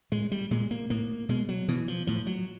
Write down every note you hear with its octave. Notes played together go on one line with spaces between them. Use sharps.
A2 G#3
G3
A#2 G#3
A#3
A2 A#3
B2 G#3
F#3
B2 E3
F3
A2 F3
F#3